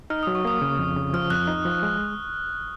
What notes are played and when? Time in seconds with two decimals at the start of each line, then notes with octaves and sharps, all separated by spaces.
0.10 D#4 F6
0.23 F#3 D#6
0.35 C#6
0.45 A#3 D#6
0.62 C#3
0.79 F2
0.96 C#3
1.13 F3 F6
1.30 F2 F#6
1.47 D#4
1.65 F3
1.83 G#3